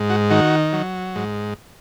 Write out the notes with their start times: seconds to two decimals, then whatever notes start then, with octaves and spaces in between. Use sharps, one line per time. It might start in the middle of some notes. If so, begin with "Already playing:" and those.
Already playing: G#2
0.10 F#4
0.30 D#3 F#4
0.73 F#3
1.16 G#2